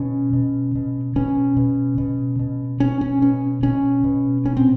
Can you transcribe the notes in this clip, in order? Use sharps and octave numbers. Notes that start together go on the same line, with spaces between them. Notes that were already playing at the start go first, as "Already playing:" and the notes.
Already playing: B2 C#4
B2
B2
B2 C#4
B2
B2
B2
B2 C#4
C#4
B2 C#4
B2 C#4
B2
A#2 C#4
C4